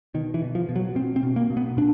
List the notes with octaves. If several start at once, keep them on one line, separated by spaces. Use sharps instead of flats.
B2 D#3
E3
B2
F3
B2
F#3
B2 C4
C4
B2
A#3
B2
B3
A#2 D4